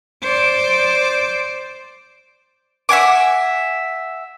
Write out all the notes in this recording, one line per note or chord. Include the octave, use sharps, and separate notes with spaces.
C5 D5
E5 F#5 G#5 D6